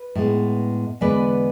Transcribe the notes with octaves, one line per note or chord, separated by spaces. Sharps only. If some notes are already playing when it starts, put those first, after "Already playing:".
Already playing: B4
A2 G#3 B3
E2 D3 G#3 B3 B4 D5